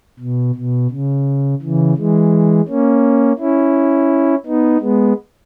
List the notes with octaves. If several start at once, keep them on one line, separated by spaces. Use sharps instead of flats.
B2
B2
C#3
C#3 E3
E3 G#3
A#3 C#4
C#4 E4
B3 D#4
G#3 B3